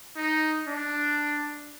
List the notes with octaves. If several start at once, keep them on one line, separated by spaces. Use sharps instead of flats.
D#4
D4